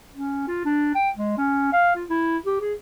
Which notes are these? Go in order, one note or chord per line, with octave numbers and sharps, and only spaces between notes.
C#4
F4
D4
G5
G#3
C#4
F5
F4
E4
G4
G#4